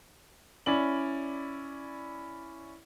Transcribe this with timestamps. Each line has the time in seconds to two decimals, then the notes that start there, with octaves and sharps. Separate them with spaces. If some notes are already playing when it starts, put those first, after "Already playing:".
0.66 C#4 E4 D5 F#7